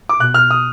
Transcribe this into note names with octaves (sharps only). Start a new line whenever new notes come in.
D6
B2 F#6
F6
D#6